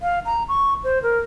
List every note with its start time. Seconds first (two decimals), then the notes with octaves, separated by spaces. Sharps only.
0.01 F5
0.26 A#5
0.49 C#6
0.84 C5
1.03 A#4